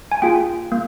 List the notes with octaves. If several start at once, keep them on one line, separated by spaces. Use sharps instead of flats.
G#5
A#3 F4 G#4 G5
A#3